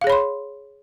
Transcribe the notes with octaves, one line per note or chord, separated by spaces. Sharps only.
G#4 C#5 F5 B5 C6